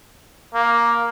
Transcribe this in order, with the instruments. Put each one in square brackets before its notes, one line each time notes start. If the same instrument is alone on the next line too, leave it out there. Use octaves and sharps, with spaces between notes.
[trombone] A#3